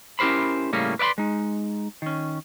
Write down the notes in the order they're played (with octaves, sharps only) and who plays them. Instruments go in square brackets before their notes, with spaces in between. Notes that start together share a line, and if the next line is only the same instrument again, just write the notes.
[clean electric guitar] C#4 E4 G4 A#4 C5 B5
A2 C#3 G3 A#3 C#4
B4 D5 F5 B5 C6
G#3 D#4
D#3 C#4